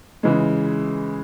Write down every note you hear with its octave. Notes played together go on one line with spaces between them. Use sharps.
C#3 E3 G#3